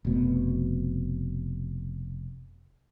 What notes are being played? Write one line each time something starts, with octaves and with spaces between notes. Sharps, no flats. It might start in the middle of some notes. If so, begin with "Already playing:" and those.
F1 B2